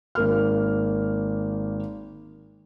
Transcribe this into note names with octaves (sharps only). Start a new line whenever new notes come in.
G#1 A#3 F6